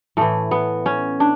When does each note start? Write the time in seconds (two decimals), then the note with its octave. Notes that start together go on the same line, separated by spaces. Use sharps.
0.17 A2 E3 A3
0.51 B3
0.86 C#4
1.20 D4